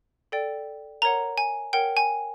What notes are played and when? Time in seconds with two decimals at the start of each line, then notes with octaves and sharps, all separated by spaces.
0.32 A4 D5 G5
1.02 A#4 C#5 F#5 A#5
1.38 G#5
1.73 A#4 C#5 F#5 G5
1.97 G#5